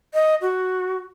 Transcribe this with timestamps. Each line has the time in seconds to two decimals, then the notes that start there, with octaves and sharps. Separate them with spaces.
0.14 D#5
0.41 F#4